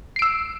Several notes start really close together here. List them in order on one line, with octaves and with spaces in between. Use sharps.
C7 D7 E6